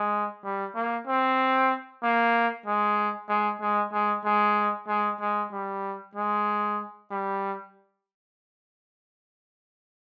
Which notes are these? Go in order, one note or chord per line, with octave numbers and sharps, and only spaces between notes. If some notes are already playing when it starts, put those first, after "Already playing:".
Already playing: G#3
G3
A#3
C4
A#3
G#3
G#3
G#3
G#3
G#3
G#3
G#3
G3
G#3
G3